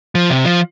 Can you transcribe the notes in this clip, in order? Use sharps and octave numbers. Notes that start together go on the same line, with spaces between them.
F3
C3
F3